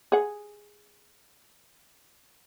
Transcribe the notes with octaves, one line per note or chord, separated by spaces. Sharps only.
G#4 F#5